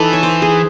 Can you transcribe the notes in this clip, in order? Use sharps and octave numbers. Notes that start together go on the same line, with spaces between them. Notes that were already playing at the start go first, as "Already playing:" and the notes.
Already playing: E3 D#4 A4
C#5
C5
G#4